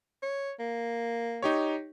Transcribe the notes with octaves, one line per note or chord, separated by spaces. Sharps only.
C#5
A#3
D#4 G4 C#5